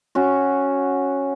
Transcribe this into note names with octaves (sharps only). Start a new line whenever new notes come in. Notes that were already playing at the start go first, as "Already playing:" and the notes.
C#4 F#4